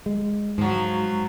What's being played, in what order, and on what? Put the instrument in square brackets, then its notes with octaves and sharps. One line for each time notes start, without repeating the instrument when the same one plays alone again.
[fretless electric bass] G#3
[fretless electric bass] G#2 [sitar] F3 F#3